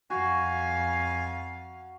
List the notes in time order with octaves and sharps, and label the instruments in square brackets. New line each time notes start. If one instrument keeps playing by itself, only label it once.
[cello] F2 F5 [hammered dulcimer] F#4 [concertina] G#5